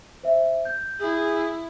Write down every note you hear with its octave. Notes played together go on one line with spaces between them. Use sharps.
C5 E5
G6
E4 G#4